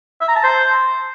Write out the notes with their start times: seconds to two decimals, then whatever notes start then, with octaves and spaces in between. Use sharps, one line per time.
0.21 E5
0.28 A#5
0.36 A5
0.43 C5